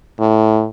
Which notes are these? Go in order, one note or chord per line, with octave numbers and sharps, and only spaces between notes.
A2